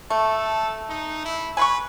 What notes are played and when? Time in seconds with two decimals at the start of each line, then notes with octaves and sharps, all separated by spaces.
0.10 A3 A4
0.89 D#4
1.25 E4
1.57 B4 G#5 C6 C#6